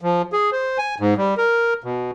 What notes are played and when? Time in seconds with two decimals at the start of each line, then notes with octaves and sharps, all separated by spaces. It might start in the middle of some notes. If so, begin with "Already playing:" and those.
0.02 F3
0.33 G#4
0.52 C5
0.78 G#5
1.00 G#2
1.17 G3
1.37 A#4
1.84 B2